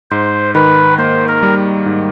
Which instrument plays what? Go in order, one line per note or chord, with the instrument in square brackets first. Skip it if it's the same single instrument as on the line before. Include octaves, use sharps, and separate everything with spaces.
[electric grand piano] G#2 [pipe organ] C5
[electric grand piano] D#3 [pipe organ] B4
[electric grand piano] A#3 [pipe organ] C5
[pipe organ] A#4
[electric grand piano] G3
G#2